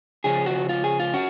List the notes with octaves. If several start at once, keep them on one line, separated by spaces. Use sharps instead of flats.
C#3 F3 C#4 G#4
F#4
F4
G#4
F4
C#4 F#4